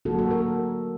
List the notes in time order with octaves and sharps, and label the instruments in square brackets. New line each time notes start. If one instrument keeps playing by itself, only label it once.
[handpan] D3 F#3 A#3 F#4 A4
F#4 A4
A#4